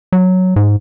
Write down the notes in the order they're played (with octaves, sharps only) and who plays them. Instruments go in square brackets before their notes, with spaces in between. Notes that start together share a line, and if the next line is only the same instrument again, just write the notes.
[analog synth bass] F#3
G#2